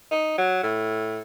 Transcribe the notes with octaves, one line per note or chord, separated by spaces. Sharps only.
D#4
F#3
A2